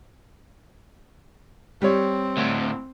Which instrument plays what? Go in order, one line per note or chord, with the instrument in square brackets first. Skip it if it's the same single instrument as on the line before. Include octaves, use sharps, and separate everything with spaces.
[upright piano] G3 C#5 [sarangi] C4
[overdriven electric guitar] D2 A2